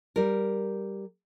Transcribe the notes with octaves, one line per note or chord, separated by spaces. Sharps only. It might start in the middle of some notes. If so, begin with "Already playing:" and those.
G3 A#4